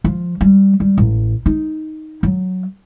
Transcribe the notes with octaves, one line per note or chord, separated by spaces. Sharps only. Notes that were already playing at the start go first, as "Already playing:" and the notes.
F3
G3
G3
A1
D#4
F#3